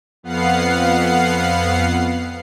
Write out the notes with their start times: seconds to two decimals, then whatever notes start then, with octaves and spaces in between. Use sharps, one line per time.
0.23 F2 B3 F5 F#5 C7